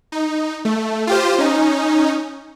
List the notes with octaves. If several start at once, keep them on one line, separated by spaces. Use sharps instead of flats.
D#4
A3
F4 G4 C5
C#4 D#4